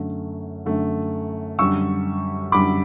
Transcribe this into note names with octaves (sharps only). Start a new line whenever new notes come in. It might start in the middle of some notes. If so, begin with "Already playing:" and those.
Already playing: F#2 D3 A3
F#2 D3 A3
F#2 D3 G3 C#6 E6
F#2 D3 G3 B5 D6